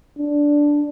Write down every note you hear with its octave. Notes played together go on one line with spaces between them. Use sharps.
D4